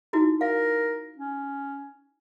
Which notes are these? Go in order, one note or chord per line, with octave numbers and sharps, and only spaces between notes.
D#4 E4 F#4
A#4 F5
C#4